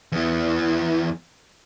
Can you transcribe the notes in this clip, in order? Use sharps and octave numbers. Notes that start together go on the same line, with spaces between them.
E2 E3